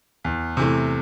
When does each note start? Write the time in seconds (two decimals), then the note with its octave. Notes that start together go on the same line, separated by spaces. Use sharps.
0.24 E2
0.57 C3 E3 A3